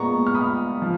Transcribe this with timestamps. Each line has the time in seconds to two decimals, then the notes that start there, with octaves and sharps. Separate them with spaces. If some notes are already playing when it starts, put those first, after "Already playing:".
Already playing: A#2 G#3 B3 A#5 C#6
0.27 F6
0.35 B5 D#6
0.82 F3